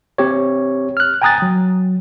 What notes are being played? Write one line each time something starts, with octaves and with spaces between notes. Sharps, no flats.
C4 G4 C#5
F6 F#6
G5 G#5 A#5 D#6 F#6 A6
F#3